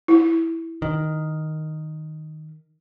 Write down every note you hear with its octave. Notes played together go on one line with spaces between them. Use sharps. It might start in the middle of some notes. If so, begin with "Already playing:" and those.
E4
D#3